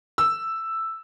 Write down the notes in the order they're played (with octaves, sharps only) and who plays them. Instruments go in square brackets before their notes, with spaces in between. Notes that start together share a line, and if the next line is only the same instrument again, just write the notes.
[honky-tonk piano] E6